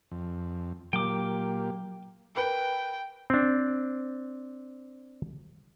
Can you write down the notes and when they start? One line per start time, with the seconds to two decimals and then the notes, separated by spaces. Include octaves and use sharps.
0.11 F2
0.93 A#2 F#3 A#3 G4 G5 D6
2.36 A#4 B4 G5
3.30 C4 D4